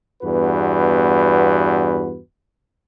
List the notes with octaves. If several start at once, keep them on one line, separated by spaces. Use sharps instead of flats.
E2 G2 B3 F#4 B4